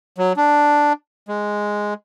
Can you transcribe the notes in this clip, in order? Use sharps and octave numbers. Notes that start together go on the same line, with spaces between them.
F#3
D4
G#3